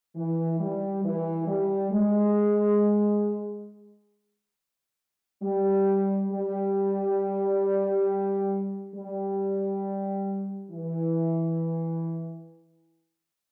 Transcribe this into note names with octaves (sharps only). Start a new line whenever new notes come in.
E3
G3
E3
G3
G#3
G3
G3
G3
E3